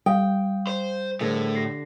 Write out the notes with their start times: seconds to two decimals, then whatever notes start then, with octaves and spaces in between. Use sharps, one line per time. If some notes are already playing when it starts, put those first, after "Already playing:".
0.06 G3 F5 G5 D#6
0.67 C5
1.21 A2 D3 G#4 A#4 C5
1.55 G4 A#6 C7